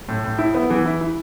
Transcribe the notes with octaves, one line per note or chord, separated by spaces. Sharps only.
A2
A2
E4
B3
E3
E4
E4